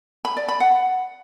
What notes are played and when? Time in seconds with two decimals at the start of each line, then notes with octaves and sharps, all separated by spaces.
0.25 B5
0.37 D5
0.48 B5
0.60 F#5